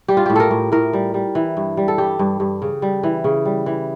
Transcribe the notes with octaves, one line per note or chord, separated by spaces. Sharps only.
G3 G4
F4
A2 G4
A4 A#4
A2
A2 A#4
G3
G3
E3
G2
G3
A4
G2 G4
G2
G2
C#3
G3
E3
C#3
G3
E3